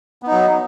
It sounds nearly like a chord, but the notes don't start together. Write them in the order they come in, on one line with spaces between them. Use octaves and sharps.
B3 D#4 F#3